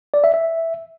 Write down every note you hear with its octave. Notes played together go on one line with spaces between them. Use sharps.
D5
E5
E5